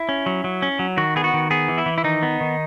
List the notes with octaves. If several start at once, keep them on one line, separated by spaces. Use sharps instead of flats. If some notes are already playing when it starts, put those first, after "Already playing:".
Already playing: E4
C#4
F#3
F#3
C#4
F#3
D#3 F#4
B3 G#4
F#4
D#3
B3 G#4
E3
E4
E3
E4
D#3 D#4
B3
D#3